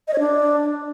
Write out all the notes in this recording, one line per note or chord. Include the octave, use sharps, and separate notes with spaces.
D#5
C#5
D4